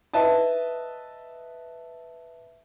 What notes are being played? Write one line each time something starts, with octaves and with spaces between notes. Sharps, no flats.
B4 D#5 E5 A5